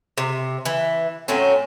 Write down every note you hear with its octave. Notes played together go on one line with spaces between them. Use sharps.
C3
E3
A2 F#3 C4 C#4